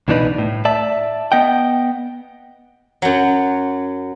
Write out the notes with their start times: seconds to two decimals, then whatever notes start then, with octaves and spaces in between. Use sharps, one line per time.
0.08 C2 B2 E3 D4 D#4 B4
0.38 A2
0.65 D5 E5 A5
1.32 B3 D#5 F#5 G5
3.02 F#2 F#3